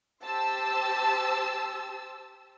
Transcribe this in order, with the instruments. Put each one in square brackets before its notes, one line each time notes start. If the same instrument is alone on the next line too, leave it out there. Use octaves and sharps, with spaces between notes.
[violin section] G4 C5 A5 E6